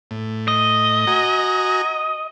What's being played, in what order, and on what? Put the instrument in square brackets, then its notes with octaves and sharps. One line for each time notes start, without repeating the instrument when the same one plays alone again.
[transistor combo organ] A2
[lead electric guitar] D#5
[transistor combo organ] F#4 G#5 A#5